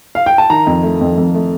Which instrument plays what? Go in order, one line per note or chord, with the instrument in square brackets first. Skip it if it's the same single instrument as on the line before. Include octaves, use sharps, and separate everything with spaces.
[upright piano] F5
G5
A5
D#3 A#5
F2
A3
F2
F2
A3